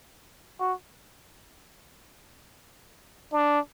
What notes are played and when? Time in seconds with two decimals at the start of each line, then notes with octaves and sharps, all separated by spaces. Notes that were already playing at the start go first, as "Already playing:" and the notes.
0.59 F#4
3.32 D4